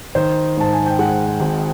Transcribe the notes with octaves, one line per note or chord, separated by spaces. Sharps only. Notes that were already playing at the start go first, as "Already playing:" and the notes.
D#3 C5
G#2 A5
G#5
G5
G#3 F#5
G#1